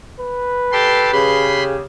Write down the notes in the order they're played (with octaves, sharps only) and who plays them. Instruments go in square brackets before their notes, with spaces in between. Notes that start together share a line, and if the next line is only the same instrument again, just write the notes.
[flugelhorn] B4
[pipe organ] G4 A4 C6
[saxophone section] C#3 G4 [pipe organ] B5 C6